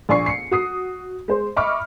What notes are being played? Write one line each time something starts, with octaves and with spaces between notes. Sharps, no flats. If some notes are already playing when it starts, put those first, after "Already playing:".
A#1 D5 G#5 C#6 C7
C7 C#7
F#4 D#6 C7
G#3 C5
D#5 E5 B5 C#6 D6 F6